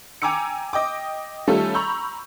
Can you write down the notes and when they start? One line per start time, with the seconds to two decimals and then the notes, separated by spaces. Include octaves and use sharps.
0.22 G5 G#5 A#5 D6 E6 C#7
0.73 D#5 G5 D6
1.47 D#3 G3 A3 C#4 F4 A4
1.74 A#5 B5 C#6 E6 G6